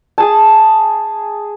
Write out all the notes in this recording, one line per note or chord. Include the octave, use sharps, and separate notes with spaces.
G#4 A5